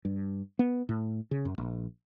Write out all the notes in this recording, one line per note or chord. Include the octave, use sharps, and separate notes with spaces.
G2
B3
A2
C#3
F#2
A#1